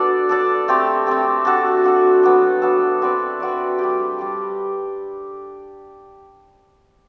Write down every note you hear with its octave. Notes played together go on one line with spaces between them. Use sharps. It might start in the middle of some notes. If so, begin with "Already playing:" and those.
Already playing: B3 D4 F#4 A4 D5
D4 A4 D5
A3 C4 G4
A3 C4 G4
D4 F#4 A4
D4 F#4 A4
F#3 B3 D4 A4
F#3 B3 D4 A4
C4 F#4 B4 D5
C4 F#4 B4 D5
G3 D4 G4
G3 D4 G4